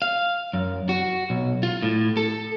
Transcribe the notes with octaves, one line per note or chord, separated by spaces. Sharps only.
F5
F#2
F#4
B1
F4
A2
A4